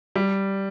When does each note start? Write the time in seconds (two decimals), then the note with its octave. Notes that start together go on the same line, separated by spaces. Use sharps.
0.16 G3